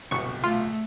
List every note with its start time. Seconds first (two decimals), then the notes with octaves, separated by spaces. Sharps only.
0.11 D1 G1 C2 B2 C#6
0.44 A3 F4